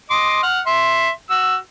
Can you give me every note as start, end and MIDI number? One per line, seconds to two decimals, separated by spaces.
0.10 0.42 75
0.10 0.42 84
0.10 0.42 86
0.43 0.60 78
0.43 0.60 89
0.67 1.10 76
0.67 1.10 84
1.30 1.56 66
1.30 1.56 88